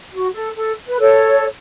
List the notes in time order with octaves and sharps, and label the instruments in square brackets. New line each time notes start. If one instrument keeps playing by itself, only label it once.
[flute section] F#4
A4
A4
B4
A4 C#5